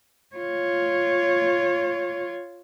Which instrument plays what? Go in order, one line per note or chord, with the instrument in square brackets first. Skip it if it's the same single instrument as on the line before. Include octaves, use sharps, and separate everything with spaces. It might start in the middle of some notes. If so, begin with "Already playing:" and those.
[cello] F4 C#5